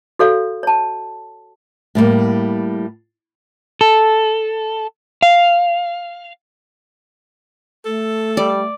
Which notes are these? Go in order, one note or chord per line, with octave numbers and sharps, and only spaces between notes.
F#4 A4 C#5 F5
C#5 A5
A2 G3 A3 A#3
A4
F5
A3 A4
G3 D5